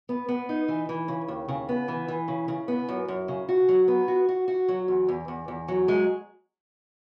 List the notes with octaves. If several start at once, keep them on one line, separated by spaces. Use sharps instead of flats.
B3
B3
D#4
E3
E3
C#3
D#2
C#3
B3
E3
E3
C#3
C#3
B3
F#2
F#2
C#3
F#4
F#3
B3
F#4
F#4
F#4
F#3
E2
E2
E2
E2
F#3
G#3